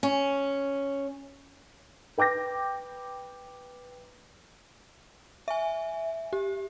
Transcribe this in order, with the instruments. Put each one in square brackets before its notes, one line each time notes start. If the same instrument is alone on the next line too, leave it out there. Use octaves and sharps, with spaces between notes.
[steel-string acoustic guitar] C#4
[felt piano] B4 G5 D6 G6 A#6
[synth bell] E5 G#5
G4